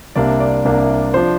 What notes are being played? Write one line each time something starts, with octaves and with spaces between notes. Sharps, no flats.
C2 C3 A#3 D4 D5
D5
C2 C3 A#3 D4
F3 D4 C5